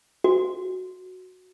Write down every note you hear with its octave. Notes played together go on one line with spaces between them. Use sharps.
F#4